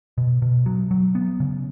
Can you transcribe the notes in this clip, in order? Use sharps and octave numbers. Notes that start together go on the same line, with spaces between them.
B2
B2
F#3
F#3
B3
C#3